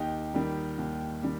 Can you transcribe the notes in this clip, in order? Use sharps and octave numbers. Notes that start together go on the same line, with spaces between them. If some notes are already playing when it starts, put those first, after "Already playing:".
Already playing: D#2 D#4 G4
D#3 G3
D#2
D#3 G3